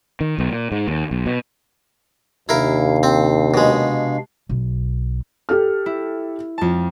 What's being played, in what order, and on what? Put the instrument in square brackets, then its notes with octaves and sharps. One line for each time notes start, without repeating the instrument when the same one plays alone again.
[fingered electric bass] D#3
B1
A#2
G#2
D#2
B1
B2
[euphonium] D#2 [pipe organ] C3 D4 F5 [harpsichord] E4 A#4
[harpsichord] C4
B2 G#3
[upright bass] B1
[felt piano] G4 A4 F6
[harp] E4
F2 A5